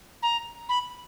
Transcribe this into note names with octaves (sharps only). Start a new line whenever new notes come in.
A#5
B5